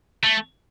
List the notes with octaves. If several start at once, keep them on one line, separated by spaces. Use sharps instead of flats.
A3